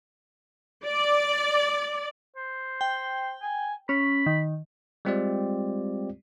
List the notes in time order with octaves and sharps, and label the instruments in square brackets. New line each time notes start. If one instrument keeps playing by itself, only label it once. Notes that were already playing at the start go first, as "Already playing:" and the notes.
[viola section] D5
[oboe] C5
[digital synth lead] G5
[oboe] G#5
[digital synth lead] C#4 [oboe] B5
[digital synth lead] D#3
[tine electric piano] G3 G#3 C4 F4 G4 D5